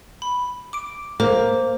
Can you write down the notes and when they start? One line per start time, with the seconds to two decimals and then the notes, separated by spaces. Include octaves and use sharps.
0.22 B5
0.73 D6 D7
1.20 A#3 C5